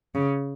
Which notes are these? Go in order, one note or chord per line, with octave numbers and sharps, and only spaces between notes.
C#3